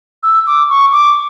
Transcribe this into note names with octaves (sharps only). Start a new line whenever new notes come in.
E6
D6
C#6
D6